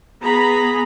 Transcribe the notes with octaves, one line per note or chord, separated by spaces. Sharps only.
B3 G#4 A#5 B5